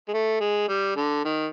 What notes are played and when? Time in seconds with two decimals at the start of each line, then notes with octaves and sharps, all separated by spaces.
0.08 G#3
0.14 A3
0.40 G#3
0.68 G3
0.96 D3
1.25 D#3